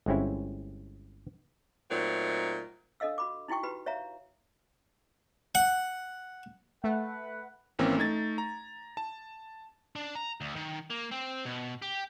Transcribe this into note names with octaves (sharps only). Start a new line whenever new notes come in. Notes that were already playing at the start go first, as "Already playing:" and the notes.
G1 G#3 C4 C#4 E4
A#2 F#3 A3 C4 D#4 F#4
D4 A4 D#5 F5 E6
F#4 B5 D6
D#4 E4 F#4 G5 C#6
F#4 G4 B4 B5
C#5 E5 F5 A#5
F#5
A3 B4 F#5
G#1 E3 A#3 C4 C#4 E4
A3 D#4 G#6 A6
A#5
A5
D4
A#5
D2
D#3
A#3
C4
B2
G4